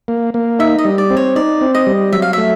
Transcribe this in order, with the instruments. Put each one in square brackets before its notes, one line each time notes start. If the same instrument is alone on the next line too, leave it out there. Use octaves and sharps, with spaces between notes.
[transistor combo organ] A#3
A#3
[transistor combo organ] D#4 [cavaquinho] E5
[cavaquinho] D#5
[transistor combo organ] G3
[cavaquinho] D5
[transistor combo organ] C4
[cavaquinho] C#5
[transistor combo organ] D#4 [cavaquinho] D5
[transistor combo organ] C4
[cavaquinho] D#5
[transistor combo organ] G3
[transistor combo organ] F#3 [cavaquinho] E5
[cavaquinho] F5
[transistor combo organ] A3 [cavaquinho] E5